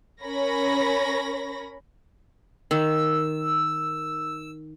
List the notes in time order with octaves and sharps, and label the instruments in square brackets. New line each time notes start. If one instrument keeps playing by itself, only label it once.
[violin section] C#4 A#4 C#5 B5 A#6
[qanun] D#3 [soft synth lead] E6